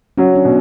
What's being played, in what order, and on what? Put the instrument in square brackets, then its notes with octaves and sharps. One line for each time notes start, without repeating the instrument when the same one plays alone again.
[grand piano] F#3 [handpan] C#4
[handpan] D4
[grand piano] B2